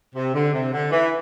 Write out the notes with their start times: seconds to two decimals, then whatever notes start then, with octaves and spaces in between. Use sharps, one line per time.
0.15 C3
0.35 D3
0.53 C3
0.73 D3
0.92 E3